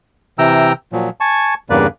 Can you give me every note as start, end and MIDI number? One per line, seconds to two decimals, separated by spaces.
0.39 0.72 48
0.39 0.72 52
0.39 0.72 79
0.39 0.72 82
0.39 0.72 88
0.93 1.10 46
0.93 1.10 53
0.93 1.10 54
1.20 1.54 80
1.20 1.54 81
1.20 1.54 85
1.70 1.87 40
1.70 1.87 43
1.70 1.87 49
1.70 1.87 58
1.70 1.87 71
1.70 1.87 74